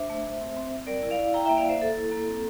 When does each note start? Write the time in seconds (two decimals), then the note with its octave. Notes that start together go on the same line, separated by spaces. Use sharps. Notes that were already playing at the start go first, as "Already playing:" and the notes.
Already playing: D4 C5 E5
0.10 A3
0.24 A3
0.40 C4
0.57 C4
0.72 C4
0.87 G3 A#4 D5
1.03 E4
1.10 D5 F5
1.19 E4
1.34 E4 G5 A#5
1.45 A#3 E5 G5
1.57 D5 F5
1.65 A#3 C5 E5
1.81 A#3 A4
1.97 E4
2.12 A#3
2.27 C4